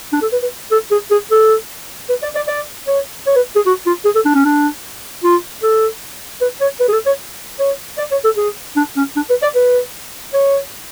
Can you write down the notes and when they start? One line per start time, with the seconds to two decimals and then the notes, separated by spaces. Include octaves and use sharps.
0.13 D4
0.22 A4
0.32 B4
0.43 B4
0.71 A4
0.91 G#4
1.11 G#4
1.31 A4
2.09 B4
2.23 D5
2.35 D5
2.48 D5
2.87 C#5
3.27 C#5
3.36 B4
3.56 G#4
3.66 F#4
3.86 F4
4.05 G#4
4.15 A4
4.25 D4
4.35 C#4
4.45 D4
5.24 F4
5.63 A4
6.41 B4
6.61 C#5
6.80 B4
6.89 G#4
6.93 A4
7.06 C#5
7.59 C#5
7.98 D5
8.11 C#5
8.25 A4
8.37 G#4
8.77 D4
8.97 C#4
9.16 D4
9.30 B4
9.42 D5
9.55 B4
10.33 C#5